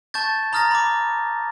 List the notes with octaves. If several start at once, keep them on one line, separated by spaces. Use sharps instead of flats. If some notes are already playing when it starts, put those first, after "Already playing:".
A5 C#6 G6 A6
A#5 D#6 F6 A6 A#6
B5 D6